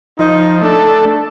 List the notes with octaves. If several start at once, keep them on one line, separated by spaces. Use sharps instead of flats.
F3 D#4
A3 D4 A4